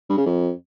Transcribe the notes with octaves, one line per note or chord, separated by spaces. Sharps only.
G2
C#3
F2